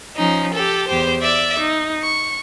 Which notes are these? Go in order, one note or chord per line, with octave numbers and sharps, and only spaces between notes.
F3 C#4 D#4
G4 A4
E2 G4 C5
D5 E5 D6
D#4
C#6